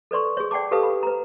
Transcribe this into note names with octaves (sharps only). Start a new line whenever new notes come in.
A4 B4 D5 C6 C#6
G#4 C#5
D5 F#5 G5 A5 D6
G4 A4 B4 F5 A5 D#6
B5
B4 A#5